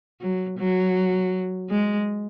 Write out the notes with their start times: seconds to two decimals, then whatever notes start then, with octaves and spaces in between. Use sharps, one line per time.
0.21 F#3
0.58 F#3
1.70 G#3